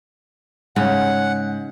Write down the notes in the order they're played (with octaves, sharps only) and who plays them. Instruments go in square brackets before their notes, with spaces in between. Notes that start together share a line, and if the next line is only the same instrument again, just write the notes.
[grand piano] G#2 [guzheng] C#3 [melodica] F#5